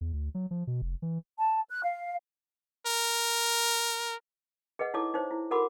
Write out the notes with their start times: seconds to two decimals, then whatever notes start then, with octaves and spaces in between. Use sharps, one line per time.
0.01 E2
0.13 D2
0.35 F#3
0.51 F3
0.67 B2
0.82 F1
1.02 E3
1.37 A5
1.70 F#6
1.83 F5
2.87 A#4
4.79 G#4 B4 D#5 F#5
4.94 D#4 E4 A4 C#5 D6
5.14 D#4 C5 C#5
5.31 E4
5.51 F#4 A4 A#4 F#5 B5 D6